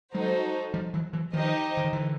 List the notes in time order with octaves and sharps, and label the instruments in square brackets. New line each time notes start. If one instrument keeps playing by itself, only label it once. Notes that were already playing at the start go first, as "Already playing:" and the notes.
[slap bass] F#3 G#3 [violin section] D#4 F#4 A4 C5
[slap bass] F3 G3
E3 F#3
E3 F#3
[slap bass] D#3 F3 [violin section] D#4 G4 C5 D#5
[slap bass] D3
D#3
D3 E3